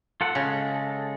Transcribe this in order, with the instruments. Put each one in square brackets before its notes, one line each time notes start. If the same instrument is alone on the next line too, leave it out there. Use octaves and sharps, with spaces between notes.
[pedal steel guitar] F4 A4 F#5
[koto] C#3 [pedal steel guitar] G#3 A4